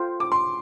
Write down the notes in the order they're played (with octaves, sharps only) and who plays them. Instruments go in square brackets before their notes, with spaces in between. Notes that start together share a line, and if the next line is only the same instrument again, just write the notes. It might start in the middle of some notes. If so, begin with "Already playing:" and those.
Already playing: [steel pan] F4 A4 C5 G5
[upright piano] D6
C6